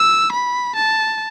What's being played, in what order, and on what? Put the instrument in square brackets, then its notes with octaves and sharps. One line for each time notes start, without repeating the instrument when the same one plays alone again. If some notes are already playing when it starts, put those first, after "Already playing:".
Already playing: [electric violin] E6
B5
A5